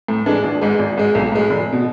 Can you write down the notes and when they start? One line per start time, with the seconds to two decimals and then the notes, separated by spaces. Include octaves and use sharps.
0.08 A2
0.26 E3 G#3 D4 A4
0.44 G#1
0.61 G#2 G#3
0.79 G#1
0.98 G#2 G#3
1.15 B1
1.32 A2 G#3
1.50 F1
1.73 B2